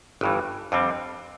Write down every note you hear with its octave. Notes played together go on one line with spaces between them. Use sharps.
G1 G2 E3
F2 D3 G3 C4